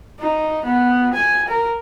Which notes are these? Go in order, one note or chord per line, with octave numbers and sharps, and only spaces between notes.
D#4
B3
G#5
A#4